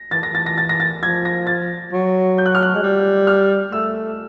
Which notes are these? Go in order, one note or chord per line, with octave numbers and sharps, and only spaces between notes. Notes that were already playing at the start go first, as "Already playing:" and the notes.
Already playing: A#6
E3 A6
A#6
E3
A6
A#6
A6
A#6
A6
F3 G#6
A#6
A6
F#3
G6
F#6
F6
F#6
G#3
G3
F6
A3 E6